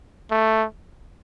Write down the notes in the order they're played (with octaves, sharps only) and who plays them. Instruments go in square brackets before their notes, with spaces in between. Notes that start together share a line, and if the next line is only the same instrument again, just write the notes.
[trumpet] A3